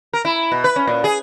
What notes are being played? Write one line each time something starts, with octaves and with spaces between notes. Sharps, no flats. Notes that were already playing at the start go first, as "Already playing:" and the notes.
A#4
E4
B2
B4
C#4
A#2
G#4